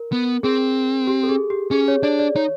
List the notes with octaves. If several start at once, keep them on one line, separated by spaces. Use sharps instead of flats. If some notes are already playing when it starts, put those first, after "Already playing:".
Already playing: A#4
B3
C4 G#4
G4
A4
G#4
G4
C#4 G#4
C#5
D4 D5
D5
D#4 C#5